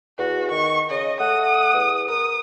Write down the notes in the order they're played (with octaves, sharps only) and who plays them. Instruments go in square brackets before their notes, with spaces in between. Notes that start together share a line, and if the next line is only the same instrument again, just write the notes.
[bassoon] E2 [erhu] F#4
[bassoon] D#3 [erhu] C#6
[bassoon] C#3 [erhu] D#5
[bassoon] A3 [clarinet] F#5 [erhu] D#6
[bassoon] E2
[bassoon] A#4 [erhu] D#6